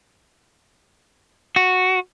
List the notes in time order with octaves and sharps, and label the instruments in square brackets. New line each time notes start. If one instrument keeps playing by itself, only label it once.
[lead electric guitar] F#4